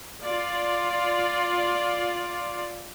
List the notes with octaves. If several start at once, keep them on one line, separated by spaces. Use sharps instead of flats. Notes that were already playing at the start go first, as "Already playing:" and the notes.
F4 D5